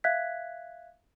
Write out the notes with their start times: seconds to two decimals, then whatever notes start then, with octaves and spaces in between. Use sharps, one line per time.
0.04 E5 F5 F#6 G#6 B6